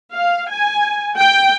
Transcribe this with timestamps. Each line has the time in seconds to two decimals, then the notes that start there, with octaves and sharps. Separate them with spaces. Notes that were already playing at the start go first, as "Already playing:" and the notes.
0.13 F5
0.51 G#5
1.17 G5